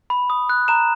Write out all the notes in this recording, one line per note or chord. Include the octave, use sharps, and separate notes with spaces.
B5
D#6
F#6
A#5 E7